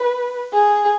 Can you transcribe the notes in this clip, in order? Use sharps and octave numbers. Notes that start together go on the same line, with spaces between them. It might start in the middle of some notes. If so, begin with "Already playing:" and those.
Already playing: B4
G#4